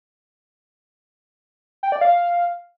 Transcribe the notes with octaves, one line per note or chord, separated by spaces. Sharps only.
G5
D5
F5